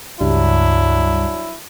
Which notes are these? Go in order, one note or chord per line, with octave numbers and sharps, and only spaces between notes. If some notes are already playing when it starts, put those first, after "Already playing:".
C#2 G2 F#3 G3 D4 E4